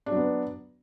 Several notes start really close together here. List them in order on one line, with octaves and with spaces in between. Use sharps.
D4 F#3 B3